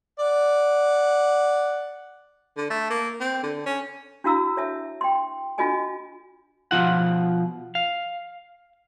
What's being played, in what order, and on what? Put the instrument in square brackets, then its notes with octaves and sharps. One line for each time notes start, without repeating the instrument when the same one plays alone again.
[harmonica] D5 F#5
[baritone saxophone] D3
A3
A#3
C4
D3
C#4
[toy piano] D4 E4 F#4 F5 A#5 E6
C#5 E5 A5
G5 C6
D4 F4 F#4 D#5 G#5 A5
[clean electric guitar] B2 F3 F4 F#5
F5